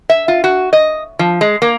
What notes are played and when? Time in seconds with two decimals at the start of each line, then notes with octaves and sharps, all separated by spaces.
0.10 E5
0.28 F4
0.44 F#4
0.73 D#5
1.19 F3
1.41 G#3
1.62 A#3